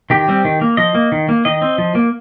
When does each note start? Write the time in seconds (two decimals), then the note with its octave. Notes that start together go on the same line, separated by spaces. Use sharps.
0.10 D#3 G4
0.28 G3 C4
0.45 D#3
0.61 A#3
0.77 F3 D#5
0.95 A#3
1.12 D#3
1.29 A#3
1.45 D#3 D#5
1.62 C4
1.78 F3
1.95 A#3